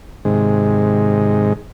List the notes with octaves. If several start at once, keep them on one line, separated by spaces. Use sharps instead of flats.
G#2 C3 D#3 G#3